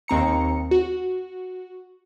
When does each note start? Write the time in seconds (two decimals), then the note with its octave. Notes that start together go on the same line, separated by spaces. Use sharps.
0.08 D#2 C4 A#5 C#7
0.71 F#4